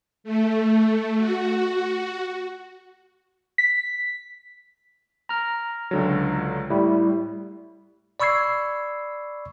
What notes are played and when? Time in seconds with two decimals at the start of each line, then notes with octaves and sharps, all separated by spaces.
0.24 A3
1.18 F#4
3.58 B6
5.29 A#5 F6
5.91 C#2 D3 F#3
6.70 A2 G3 E4
8.20 D5 B5 C#6 E6 G#6 C7